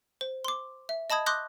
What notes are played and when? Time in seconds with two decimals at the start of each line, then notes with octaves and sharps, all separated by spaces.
0.21 C5
0.45 C6 D6
0.89 E5
1.10 D#5 A5 B5 D#6 G#6
1.26 C6 D6 D#6 F#6 G6 A#6